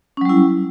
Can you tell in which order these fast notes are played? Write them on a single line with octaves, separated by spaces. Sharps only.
C#4 F#3 G3 E4